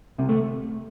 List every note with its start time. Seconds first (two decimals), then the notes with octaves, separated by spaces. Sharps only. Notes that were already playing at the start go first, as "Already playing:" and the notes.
0.18 C2 C3
0.29 A3